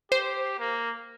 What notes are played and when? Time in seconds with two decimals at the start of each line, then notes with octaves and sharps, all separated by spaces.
0.12 G4 C5
0.59 A#3